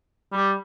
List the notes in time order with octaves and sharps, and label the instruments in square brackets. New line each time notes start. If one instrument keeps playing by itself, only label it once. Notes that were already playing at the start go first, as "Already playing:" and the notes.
[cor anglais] G3